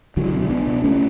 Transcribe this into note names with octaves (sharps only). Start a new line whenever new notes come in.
C#2 D3 F#3
B2
C#2 B3 D4
B2
C#2 A3 C#4